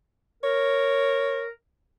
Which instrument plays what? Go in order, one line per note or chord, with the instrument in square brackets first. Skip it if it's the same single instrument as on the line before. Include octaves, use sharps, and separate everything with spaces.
[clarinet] A#4 [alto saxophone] C#5